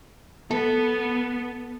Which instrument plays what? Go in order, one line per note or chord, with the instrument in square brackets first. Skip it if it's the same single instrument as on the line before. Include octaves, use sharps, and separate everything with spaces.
[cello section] B3 [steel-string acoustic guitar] A4